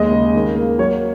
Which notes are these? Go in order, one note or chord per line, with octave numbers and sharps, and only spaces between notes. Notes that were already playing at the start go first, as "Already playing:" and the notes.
Already playing: D#2 G#3 D#5
C#3
D#3
A#3
F#3 C#5